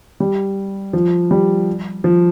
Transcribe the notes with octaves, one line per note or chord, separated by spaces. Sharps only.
G3
F3
G3
F3